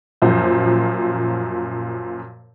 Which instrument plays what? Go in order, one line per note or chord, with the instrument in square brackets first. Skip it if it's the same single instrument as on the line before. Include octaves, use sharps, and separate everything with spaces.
[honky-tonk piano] F#2 A#2 F3 C5